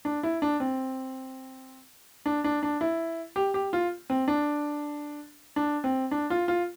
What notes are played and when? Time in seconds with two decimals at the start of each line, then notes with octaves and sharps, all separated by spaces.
0.05 D4
0.23 E4
0.42 D4
0.60 C4
2.26 D4
2.44 D4
2.63 D4
2.81 E4
3.36 G4
3.54 G4
3.73 F4
4.10 C4
4.28 D4
5.56 D4
5.84 C4
6.11 D4
6.30 F4
6.48 F4